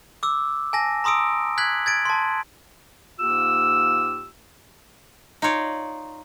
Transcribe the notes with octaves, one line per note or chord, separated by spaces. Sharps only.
D6 E6
G#5 A5 A#6
A#5 C6 D#6 E6 D7
F#6 G#6 B6 F#7
G#6 A6 D7
A5 C6
G#2 A#3 F4 G4 E6
D#4 F4 C#5 D5